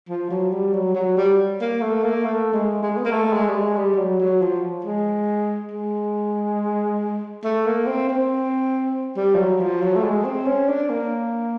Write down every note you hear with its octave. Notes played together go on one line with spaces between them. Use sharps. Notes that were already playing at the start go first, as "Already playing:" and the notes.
F3
F#3
G3
F#3
F#3
G3
A#3
A3
A#3
A3
G#3
G#3
B3
A#3
A3
G#3
G3
G#3
G3
G3
F#3
F#3
F3
G#3
G#3
A3
A#3
C4
C4
G3
F3
F#3
F3
F#3
A3
G#3
C4
C#4
D4
A#3